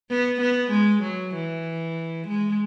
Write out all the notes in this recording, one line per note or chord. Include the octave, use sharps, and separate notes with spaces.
B3
B3
G#3
F#3
E3
G#3